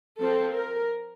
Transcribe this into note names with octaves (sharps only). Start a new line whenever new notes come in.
F3 C4 A4
A#4